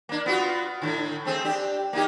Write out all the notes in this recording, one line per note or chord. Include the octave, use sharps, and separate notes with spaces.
A#3 D4
B3 F4 F#4
A2 D3
A3 C4 G#4
D4 G4
A#3 D#4 G4